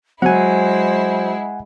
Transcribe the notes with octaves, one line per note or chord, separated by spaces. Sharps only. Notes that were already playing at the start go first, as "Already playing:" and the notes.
F#3 G#3 E4 C5 F#5 G#5